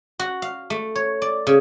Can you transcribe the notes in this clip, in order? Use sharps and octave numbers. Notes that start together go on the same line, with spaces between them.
F#4
F5
A3
C#5
D5
C#3